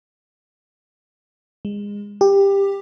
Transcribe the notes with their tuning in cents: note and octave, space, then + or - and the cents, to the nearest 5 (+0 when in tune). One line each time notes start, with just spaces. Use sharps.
G#3 -25
G4 +15